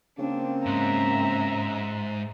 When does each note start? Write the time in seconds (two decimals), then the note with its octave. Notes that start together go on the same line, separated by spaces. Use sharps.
0.18 C#3 A#3 C4 D4
0.66 G#2 E5 A#5